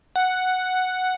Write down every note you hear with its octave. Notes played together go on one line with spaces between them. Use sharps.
F#5